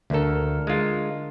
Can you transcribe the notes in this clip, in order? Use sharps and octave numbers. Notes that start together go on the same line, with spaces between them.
D2 D3 D4 A4 A#4
G#3 F4